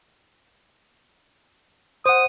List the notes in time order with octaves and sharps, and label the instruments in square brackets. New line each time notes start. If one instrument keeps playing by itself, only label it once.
[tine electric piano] C5 F#5 [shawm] D#6